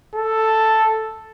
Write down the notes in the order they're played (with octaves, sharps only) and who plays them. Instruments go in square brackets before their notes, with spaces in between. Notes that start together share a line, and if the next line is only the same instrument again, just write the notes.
[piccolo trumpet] A4